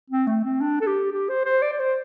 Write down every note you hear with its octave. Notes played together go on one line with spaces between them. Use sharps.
C4
A3
C4
D4
A4
G4
G4
C5
C5
D5
D5
C5